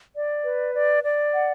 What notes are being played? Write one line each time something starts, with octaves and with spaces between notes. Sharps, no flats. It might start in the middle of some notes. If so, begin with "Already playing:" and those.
D5
B4
D5
D5
F#5